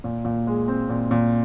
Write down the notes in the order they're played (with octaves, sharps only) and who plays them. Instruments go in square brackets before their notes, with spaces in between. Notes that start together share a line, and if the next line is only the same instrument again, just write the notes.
[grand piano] A#2
A#2
G#3
C4
A#2
A#2